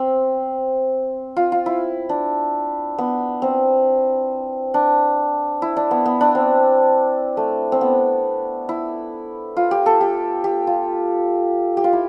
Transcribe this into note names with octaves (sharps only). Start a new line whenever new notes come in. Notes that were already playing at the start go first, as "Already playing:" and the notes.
Already playing: C4
F4
F4
E4
D4
B3
C4
D4
E4
D4
B3
B3
D4
C4
A3
C4
B3
E4
F4
G4
A4
G4
G4
F4
G4
F4
E4